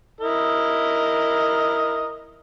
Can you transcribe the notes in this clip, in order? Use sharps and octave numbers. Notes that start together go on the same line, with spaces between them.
E4 A#4 D#5